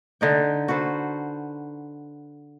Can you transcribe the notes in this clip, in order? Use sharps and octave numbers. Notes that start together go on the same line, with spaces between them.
D3 D#4 G5
F#4 A4 B4 C5